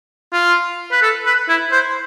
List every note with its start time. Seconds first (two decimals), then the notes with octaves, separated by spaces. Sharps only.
0.33 F4
0.92 B4
1.02 A4
1.26 B4
1.49 E4
1.72 C5